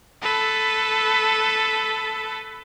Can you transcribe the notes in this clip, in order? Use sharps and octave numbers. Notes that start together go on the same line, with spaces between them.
A4 B4